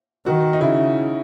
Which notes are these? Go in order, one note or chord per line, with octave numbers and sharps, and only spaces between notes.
D#3 F#4
D#4
C#3 E4